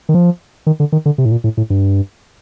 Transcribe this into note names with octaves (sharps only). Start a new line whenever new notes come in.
D#3
F3
D#3
D3
D#3
D3
C3
A2
A#2
A2
A2
G2